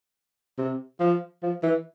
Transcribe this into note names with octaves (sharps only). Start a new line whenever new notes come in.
C3
F3
F3
E3